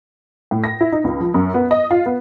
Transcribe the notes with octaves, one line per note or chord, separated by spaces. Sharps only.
A2
A#6
E4
D#4
C#2
F3
F#2
B3
D#5
F4
B3